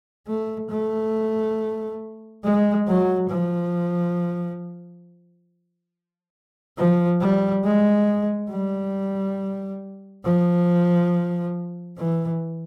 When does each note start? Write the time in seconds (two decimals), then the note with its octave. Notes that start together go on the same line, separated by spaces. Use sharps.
0.28 A3
0.70 A3
2.44 G#3
2.88 F#3
3.30 F3
6.78 F3
7.21 G3
7.64 G#3
8.50 G3
10.25 F3
11.98 E3